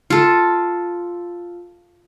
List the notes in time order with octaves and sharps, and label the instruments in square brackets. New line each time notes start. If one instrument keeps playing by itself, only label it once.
[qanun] F4 A4